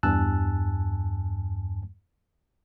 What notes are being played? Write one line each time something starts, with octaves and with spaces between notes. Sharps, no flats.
E2 G2 G#5 A5 E6 F#6